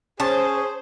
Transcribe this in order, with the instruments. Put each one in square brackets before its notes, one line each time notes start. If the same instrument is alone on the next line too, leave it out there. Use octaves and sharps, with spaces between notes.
[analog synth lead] C#4 [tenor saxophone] G#4 [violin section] C5 [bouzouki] A5